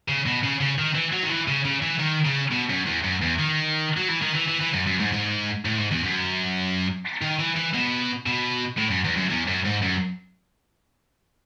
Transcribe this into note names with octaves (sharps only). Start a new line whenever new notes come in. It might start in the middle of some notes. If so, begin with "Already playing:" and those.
C#3
B2
C#3
C#3
D#3
E3
F#3
D#3
E3
C#3
C#3
E3
D#3
C#3
B2
F#2
E2
F#2
E2
D#3
F#3
E3
D#3
E3
E3
E3
F#2
F#2
G#2
G#2
A2
G#2
E2
F#2
D#3
E3
E3
B2
B2
A2
F#2
E2
F#2
E2
F#2
G#2
F#2